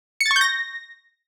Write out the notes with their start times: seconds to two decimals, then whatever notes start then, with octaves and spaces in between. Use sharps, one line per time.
0.21 C#7
0.26 A6
0.31 C#6
0.36 G6
0.41 A#6